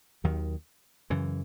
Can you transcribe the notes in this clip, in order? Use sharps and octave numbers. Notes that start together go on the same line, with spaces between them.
D#2 D#3 F#3
F#2 C#3 E3